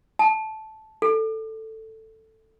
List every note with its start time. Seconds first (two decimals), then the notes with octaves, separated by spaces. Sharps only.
0.19 A5
1.02 A4